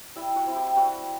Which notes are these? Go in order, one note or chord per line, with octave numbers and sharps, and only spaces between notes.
G3 E4 E5
F#4 F#5
C4 E4
G4 G5
G3 F#4 F#5